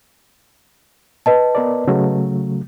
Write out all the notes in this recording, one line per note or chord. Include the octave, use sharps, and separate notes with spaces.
B4 D#5 A5
B3 A#4 D5
C#3 F#3 A3